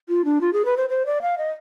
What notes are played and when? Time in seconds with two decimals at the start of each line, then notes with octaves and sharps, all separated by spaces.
0.09 F4
0.25 D4
0.41 F4
0.53 G#4
0.65 B4
0.77 C5
0.89 C5
1.06 D5
1.22 F5
1.38 D#5